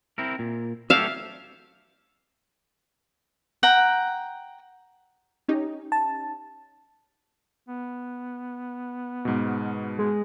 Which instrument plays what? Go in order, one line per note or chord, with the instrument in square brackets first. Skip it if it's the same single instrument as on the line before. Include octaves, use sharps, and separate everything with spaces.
[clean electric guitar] C4 E4 A#4
A#2
[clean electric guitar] F#3 A3 G4 [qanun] E5 F5
[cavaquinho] F#5 G5 A#5
[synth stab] C#4 D#4 G4
[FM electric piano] A5
[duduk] B3
[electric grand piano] G#2 B2
[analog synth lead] G#3